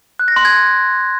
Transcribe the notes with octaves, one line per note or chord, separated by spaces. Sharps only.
F#6
A#6
C6
G#6